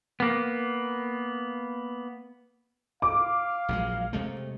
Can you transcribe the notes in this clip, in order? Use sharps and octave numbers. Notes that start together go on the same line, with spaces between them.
A#3 B3
F5 D6
A#1 F#3 G#3
C3 G#3 A3